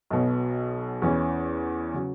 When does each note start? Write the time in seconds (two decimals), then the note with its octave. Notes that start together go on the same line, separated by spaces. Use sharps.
0.10 B1 B2 F#3
1.02 E2 E3 C#4
1.94 C#3 F#3